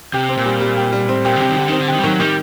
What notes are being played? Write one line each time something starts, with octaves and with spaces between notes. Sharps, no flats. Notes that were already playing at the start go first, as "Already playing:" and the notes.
C3 G4
C4
A#2
G3
G3
G4
G3
A2 C4
A#2 G4
D3
C3 G4
D#3
D3 G4
D#3 C4
D3
D#3 G4
G3
D#3 F#3
D#3 G3